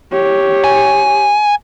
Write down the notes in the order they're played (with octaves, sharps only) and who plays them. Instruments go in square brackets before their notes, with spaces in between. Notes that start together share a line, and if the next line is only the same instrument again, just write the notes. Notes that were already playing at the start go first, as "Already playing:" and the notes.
[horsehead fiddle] G4 C#5
[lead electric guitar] G#5